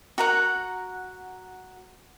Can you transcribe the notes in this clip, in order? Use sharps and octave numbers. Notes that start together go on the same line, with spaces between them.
F#4 A#4 F#5